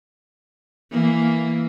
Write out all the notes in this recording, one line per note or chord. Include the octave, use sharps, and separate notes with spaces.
E3 A#3